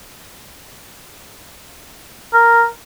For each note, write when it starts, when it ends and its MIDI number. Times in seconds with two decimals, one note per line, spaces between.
2.33 2.65 70